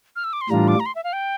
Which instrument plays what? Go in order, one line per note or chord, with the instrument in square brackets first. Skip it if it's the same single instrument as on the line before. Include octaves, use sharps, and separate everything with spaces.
[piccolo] F6
E6
D6
C6
[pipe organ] A2 E3 G3 D4 F4 [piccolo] A#5
[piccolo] D6
A#5
C6
E5
F5
G5